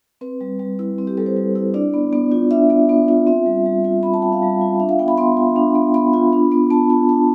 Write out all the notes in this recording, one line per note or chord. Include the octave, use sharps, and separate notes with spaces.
C4 B4
G3
G3
E4
C4
G4
G3 A4
C5
G3
E4
D4 D5
B3
B3
F4
D4 E5
B3
B3
F4
C4 E5
G3
G3
F4
C4 B5
A5
G3 G5
F5
G3
F4
D4 E5
F5
B3 G5
B5
B3 C6
F4
D4
B3
B3 B5
F4
D4
B3
B3 A5
F4
D4 A5